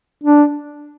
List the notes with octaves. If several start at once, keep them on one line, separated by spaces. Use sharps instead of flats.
D4